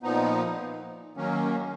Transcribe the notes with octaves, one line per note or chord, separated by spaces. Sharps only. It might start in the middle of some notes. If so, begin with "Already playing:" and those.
A#2 F3 B3 D#4
D#3 F#3 A#3 C#4